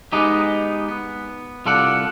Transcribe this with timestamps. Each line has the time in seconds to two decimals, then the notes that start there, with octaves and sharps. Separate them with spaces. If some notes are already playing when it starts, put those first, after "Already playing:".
0.12 G#3 B3 D#4 G4
0.88 B3
1.66 C2 F4 A4 D5 F#5